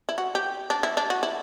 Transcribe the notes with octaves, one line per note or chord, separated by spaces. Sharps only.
E4
F#4
G4
D4
E4
D4
F#4
E4